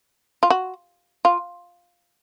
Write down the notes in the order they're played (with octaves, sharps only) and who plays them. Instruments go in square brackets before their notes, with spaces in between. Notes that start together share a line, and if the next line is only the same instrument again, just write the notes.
[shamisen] F4
F#4
F4